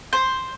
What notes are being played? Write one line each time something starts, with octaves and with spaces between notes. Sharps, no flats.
C5